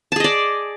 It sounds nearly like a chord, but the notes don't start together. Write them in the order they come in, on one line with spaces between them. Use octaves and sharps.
A5 G#4 D#5 D5